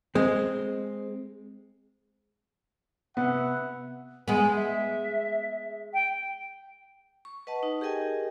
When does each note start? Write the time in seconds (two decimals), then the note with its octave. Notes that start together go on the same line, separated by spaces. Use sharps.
0.15 G#3 C4
3.17 C3 B3 E5 F#5
4.28 G#3 B3 G#5
4.55 E5
5.93 G5
7.25 C#6
7.47 B4 D#5 F#5 A5
7.63 D#4
7.81 G4 G#4 A#4 D#5 G5 G#5